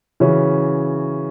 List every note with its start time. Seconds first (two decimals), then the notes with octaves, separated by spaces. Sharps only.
0.20 C#3 E3 C#4 F#4